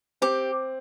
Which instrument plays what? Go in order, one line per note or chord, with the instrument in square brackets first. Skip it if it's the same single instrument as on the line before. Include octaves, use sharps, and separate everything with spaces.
[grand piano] C4 [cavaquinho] G4